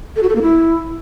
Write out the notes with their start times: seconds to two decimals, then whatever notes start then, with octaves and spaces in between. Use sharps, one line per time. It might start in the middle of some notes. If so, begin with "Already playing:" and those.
0.16 A4
0.23 F#4
0.29 A4
0.35 A#3
0.42 E4